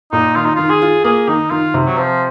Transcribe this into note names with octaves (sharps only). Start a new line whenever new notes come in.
A#2 D#4
D#3 F4
D#4
D#3 F4
G#4
F4
A#3 G#4
D#3 D#4
D#3 F4
C3
F#3
F3 C4